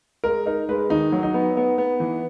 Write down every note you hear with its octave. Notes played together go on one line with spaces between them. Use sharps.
G#3 A#4
D#4 A#4
G#3 B4
D#3 D#4
F#3
D#4
B3
B3
B3
E3